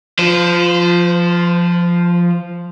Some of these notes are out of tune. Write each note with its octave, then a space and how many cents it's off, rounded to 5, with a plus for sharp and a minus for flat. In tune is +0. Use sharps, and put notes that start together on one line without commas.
F3 +0 C5 -35